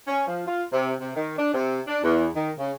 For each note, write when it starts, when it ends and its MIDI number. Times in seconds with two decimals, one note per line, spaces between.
0.07 0.24 61
0.27 0.42 53
0.47 0.63 65
0.72 0.94 48
0.99 1.11 48
1.15 1.34 51
1.38 1.53 62
1.54 1.80 48
1.87 1.99 62
2.03 2.29 40
2.34 2.51 51
2.58 2.71 49